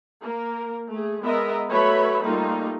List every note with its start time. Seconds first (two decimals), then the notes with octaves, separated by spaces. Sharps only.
0.21 A#3 A#4
0.91 A3 G#4
1.22 G#3 B3 A#4 D#5 E5
1.69 F#3 A3 B4 C#5 E5 B5
2.24 G3 A3 A#3 D#4 F4